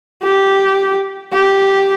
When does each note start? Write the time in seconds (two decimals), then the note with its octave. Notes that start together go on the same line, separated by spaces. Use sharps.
0.23 G4
1.32 G4